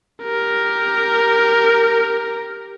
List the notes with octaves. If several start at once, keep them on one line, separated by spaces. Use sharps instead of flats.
G4 A#4